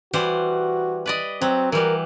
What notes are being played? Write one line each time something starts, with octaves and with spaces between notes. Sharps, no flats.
E3 G3 F#4 C5
B4 D5 D#5
F#3 C4
E3 G3 A#4